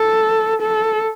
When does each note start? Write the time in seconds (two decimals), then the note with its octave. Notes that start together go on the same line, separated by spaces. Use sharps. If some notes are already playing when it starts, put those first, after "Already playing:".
Already playing: A4
0.62 A4